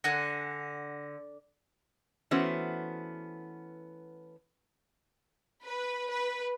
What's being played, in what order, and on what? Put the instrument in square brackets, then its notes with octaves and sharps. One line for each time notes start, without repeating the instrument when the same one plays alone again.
[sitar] D3 [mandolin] F#5 G#5 F#6 [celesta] A#6
[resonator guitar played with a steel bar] E3 A3 B3 C#4 F#4 C5
[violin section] B4
B4